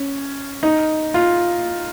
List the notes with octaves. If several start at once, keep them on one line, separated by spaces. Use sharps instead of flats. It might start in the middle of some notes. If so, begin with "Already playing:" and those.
Already playing: C#4
D#4
F4